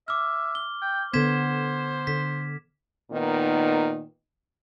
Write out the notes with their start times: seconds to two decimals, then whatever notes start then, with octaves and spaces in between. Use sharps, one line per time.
0.08 E5 D6 F6
0.55 G7
0.82 G5
1.14 D3 B3 C5 G#6 B6 E7
2.07 D3 B6
3.11 A#2 D#3 B3 D#4